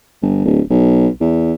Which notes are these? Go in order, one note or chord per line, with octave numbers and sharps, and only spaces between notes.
G1
D1
B1
E2